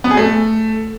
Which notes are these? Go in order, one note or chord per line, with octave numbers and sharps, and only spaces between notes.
B3
G#4
A3